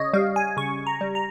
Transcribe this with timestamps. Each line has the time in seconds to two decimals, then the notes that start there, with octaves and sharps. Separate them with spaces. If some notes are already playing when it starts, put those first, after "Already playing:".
Already playing: C#3 C#5 D#5
0.13 G3 F5
0.36 G#5
0.57 C#3 C#6
0.87 A#5
1.01 G3
1.15 A#5